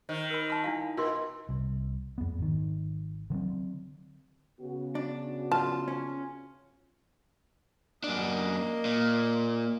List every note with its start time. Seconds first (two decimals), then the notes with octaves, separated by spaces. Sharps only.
0.09 D#3 C5
0.31 A#4 B5
0.50 A5 B5
0.64 D4 E4 F5
0.97 B2 F4 A#4 C6
1.49 C2
2.18 F2 B3
2.38 G#1 D#3
3.30 D3 F#3 B3 C4
4.60 C#3 B3 F#4
4.95 D4
5.52 F4 A5
5.88 C#4
8.04 F#2 A#3 D4 D#5
8.85 A#2